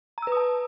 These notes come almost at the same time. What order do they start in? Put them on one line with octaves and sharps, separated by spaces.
A#5 E6 B4 D#6 A5